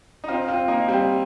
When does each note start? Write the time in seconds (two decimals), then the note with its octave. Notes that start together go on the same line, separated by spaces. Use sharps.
0.24 D#4
0.28 C4 F4
0.48 C4 F4
0.68 A#3 D#4
0.88 G3 C4